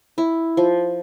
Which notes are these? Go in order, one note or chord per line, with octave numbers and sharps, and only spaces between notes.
E4
F3